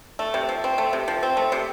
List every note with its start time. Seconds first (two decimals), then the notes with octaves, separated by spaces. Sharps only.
0.19 A3
0.34 C3
0.49 F3
0.64 C4
0.78 A3
0.93 C3
1.08 F3
1.23 C4
1.37 A3
1.52 C3